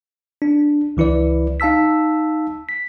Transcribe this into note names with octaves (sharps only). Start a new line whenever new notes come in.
D4
C#2 E3 E4 B4 D5
D#4 F5 A5 E6 B6
B6